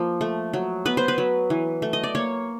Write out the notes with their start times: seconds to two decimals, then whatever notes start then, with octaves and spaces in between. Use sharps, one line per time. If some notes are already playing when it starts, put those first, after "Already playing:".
Already playing: F3 A#3
0.21 A3
0.53 F#3
0.85 B3 B4
0.97 C5
1.08 B4
1.18 F#3
1.50 E3
1.82 A3
1.93 D#5
2.04 D5
2.15 A#3 C#5